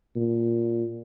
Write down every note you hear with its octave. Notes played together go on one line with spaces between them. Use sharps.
A#2